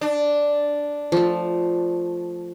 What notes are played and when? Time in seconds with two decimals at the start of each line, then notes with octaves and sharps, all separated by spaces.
0.01 D4
1.12 F3 A3